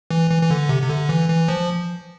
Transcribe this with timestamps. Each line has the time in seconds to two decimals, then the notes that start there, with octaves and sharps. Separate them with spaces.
0.11 E3
0.30 E3
0.42 E3
0.51 D3
0.69 C3
0.83 C3
0.89 D3
1.09 E3
1.29 E3
1.48 F3